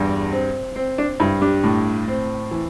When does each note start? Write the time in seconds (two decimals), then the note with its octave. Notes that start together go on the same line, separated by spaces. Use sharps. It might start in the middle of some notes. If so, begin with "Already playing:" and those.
Already playing: E2 G2
0.32 C4
0.76 C4
0.98 D4
1.20 G2 E4
1.41 D4 G4
1.63 A2
2.08 C4
2.51 E3